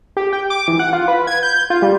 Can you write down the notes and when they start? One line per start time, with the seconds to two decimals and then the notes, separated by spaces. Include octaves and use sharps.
0.17 G4
0.33 G5
0.50 D6
0.68 E3
0.79 F#5
0.93 F4
1.08 B4
1.27 G#6
1.43 G6
1.70 F4
1.82 G3